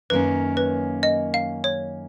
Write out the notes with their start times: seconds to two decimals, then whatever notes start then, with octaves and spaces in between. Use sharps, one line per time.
0.10 F#2 D#3 A#3 C#4 B4
0.57 B4
1.03 D#5
1.34 F5
1.64 C#5